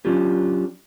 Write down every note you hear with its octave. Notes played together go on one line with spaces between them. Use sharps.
F#3 C#4 D4 F4 G4